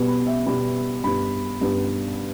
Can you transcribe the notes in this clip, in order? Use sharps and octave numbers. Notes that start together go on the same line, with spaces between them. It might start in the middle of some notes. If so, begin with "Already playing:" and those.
Already playing: B2 G3 B3
B5
E5
B2 G3 B3 B5
G2 G3 B3 B5
G2 G3 B3